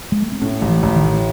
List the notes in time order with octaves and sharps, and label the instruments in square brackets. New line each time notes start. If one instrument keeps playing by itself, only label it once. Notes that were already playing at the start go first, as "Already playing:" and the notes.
[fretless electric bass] G#3
A3
C4
[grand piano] A2 [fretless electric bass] C#4
[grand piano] A1
[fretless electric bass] E3
[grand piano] A1
[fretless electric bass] D#3
[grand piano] A2